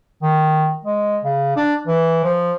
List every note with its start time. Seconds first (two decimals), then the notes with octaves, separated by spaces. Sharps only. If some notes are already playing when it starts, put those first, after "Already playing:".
0.22 D#3
0.85 G#3
1.24 C#3
1.56 D4
1.87 E3
2.24 F3